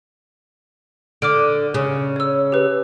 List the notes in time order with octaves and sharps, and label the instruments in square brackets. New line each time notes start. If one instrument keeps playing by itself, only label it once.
[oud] D3 [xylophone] D6 F6 D7
[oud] C#3
[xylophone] C#5 E6
G4 B4